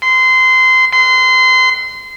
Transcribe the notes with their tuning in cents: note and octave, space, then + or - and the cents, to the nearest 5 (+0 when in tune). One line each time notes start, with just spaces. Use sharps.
C6 -20
C6 -25